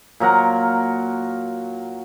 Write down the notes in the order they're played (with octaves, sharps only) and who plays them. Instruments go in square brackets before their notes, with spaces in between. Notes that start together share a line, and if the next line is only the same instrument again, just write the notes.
[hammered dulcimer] A#2 F#3 A#4 F#5